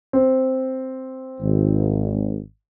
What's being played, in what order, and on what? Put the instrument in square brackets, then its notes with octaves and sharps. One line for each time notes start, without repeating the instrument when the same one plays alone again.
[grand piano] C4
[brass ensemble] G#1